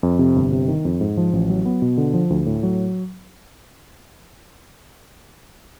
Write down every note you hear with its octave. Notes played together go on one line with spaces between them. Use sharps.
F2
C3
G1
C3
D#3
F2
G#2
F3
A1
F#3
B3
B2
D3
F3
D2
A2
F#3